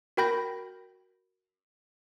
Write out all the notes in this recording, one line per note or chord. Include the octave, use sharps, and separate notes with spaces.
F#4 A#4 G5 B5 G6 A#6